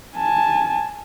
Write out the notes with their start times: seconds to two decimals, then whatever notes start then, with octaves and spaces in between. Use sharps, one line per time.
0.17 G#5 A5